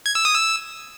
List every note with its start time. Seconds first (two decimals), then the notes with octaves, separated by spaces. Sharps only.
0.06 G#6
0.15 E6
0.25 D#6
0.35 E6